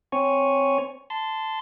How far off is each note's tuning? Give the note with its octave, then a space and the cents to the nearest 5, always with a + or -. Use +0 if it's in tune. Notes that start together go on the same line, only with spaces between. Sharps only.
C4 +0 C#5 +0 G#5 +0
A5 +0 C6 -20